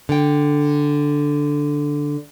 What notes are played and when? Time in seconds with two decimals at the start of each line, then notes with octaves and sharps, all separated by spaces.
0.09 D3 G5